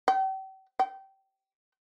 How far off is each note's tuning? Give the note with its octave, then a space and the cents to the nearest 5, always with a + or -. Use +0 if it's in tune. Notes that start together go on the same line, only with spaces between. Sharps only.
G5 -40
G5 -20